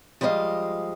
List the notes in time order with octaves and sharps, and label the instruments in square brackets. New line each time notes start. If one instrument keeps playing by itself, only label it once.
[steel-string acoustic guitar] F3 G3 G#3 B4 D#5 F5